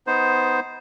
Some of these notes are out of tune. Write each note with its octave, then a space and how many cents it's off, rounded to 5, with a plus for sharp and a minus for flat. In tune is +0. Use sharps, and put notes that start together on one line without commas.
B3 +15 D#4 +15 C5 +0